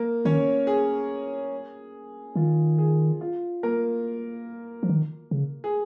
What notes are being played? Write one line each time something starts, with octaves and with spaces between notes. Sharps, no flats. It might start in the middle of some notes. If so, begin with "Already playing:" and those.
Already playing: A#3 A#4
D#3 C#4 C#5
G#4
D#3 F4
G#4
F4
A#3 A#4
F3
D#3
C#3
G#4